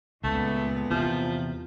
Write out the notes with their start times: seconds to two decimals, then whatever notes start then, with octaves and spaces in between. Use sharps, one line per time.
0.24 C#2 A#2 A3 B3
0.90 E2 C3 F3